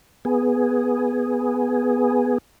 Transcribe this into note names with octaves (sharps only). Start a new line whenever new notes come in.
B3 G#4